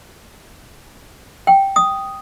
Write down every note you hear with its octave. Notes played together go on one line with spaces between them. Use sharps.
G5
D#6